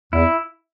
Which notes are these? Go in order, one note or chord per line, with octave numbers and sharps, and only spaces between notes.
E2 E4